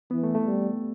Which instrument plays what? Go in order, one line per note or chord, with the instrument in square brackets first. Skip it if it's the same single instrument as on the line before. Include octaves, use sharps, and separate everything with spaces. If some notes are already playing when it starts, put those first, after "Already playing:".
[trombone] E3 [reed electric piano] B3
[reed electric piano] A3
A3
[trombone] G3